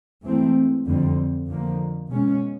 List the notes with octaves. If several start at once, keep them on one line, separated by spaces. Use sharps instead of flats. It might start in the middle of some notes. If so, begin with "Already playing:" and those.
G#2 E3 A3 C4
F2 D3 G3 C4
F2 D3 F3 A#3
B2 G#3 C#4